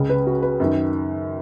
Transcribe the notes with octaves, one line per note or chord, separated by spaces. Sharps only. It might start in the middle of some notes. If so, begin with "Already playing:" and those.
Already playing: C#2 C#3
B4
F#4
B4
F#2 D#3